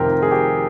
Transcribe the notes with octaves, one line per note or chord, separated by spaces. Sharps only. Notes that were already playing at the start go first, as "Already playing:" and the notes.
Already playing: F1 F2 C3 D#3 G4 A#4 C5
G#4
G4